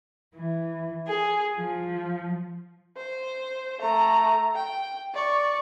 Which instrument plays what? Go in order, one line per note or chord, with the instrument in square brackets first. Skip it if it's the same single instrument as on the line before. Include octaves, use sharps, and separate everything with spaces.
[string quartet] E3
G#4
F3
[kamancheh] C5
A3 A#5
G5
D5 C#6